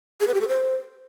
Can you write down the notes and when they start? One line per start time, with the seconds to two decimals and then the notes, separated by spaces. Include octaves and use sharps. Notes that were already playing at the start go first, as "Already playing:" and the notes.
0.21 G#4
0.27 B4
0.34 G4
0.41 A4
0.48 C5